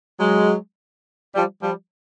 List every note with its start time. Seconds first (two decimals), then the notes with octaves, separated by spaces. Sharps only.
0.19 F#3 G#3
1.34 F3 G3
1.63 F3 G3